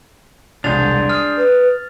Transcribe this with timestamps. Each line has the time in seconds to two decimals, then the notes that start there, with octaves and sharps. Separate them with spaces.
0.64 E1 C2 D4 G#4 C5 A6 F7
1.09 D#6 F6
1.37 B4